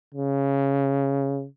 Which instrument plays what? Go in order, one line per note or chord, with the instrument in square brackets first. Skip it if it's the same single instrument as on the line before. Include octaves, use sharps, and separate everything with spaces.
[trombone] C#3